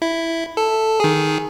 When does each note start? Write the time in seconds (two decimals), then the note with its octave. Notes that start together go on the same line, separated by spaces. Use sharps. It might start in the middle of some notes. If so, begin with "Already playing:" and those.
0.02 E4
0.57 A4
1.00 D#3 G#4